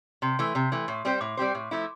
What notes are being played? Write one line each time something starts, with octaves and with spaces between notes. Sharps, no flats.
C3 C6
E3 A3
C3
E3 A3
A2
G3 C4 G4 C5
A2 D6
G3 C4 G4 C5
A2
F3 A3 E4